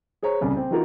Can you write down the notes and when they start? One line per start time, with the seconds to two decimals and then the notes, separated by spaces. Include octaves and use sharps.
0.23 G#4 C5 C#5 A#5
0.41 D#1 C2 C#3
0.56 C4
0.71 E3 D#4 F4 F#4 A#4